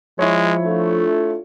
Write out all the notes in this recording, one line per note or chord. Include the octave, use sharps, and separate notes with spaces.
F3 G#3 E4 C#5
A3 D4 F4 A4